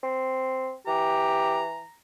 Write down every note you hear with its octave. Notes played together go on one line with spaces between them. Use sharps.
C4
E3 G4 A#5